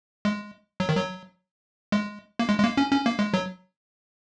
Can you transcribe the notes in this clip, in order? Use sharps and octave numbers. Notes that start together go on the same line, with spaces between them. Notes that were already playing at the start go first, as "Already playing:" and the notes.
G#3
F#3
D#3
F#3
G#3
A#3
G#3
G#3
A#3
C#4
C#4
A#3
G#3
F#3